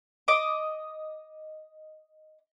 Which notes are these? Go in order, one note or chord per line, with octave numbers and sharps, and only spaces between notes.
D#5 D6